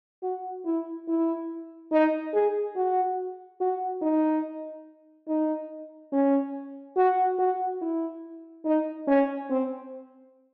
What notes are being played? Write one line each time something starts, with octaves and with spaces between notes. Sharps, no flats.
F#4
E4
E4
D#4
G#4
F#4
F#4
D#4
D#4
C#4
F#4
F#4
E4
D#4
C#4
C4